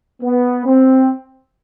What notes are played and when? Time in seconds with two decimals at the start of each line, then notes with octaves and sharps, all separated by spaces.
0.22 B3
0.66 C4